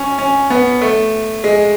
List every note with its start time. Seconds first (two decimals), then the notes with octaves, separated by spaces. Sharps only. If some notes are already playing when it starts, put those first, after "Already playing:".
Already playing: C#4
0.19 C#4
0.50 B3
0.82 A3
1.44 G#3